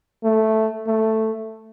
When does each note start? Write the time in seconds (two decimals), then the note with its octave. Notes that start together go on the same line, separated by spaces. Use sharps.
0.24 A3
0.87 A3